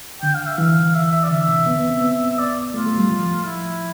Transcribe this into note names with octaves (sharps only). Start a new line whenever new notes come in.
D3 G5
F5
E5
E3 F5
E5
E5
D5
D3 E5
C3
B3
B3
C4
B3
D5
A3 F4
A3
G3
F3
E4